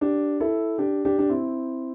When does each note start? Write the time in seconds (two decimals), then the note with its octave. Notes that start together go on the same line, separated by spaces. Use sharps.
0.01 D4 G4
0.40 E4 A4
0.78 D4 G4
1.05 D4 G4
1.19 D4
1.30 C4 E4